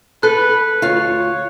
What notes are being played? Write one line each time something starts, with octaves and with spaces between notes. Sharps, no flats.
A4 B4 F#6
D2 F4 C#5 F5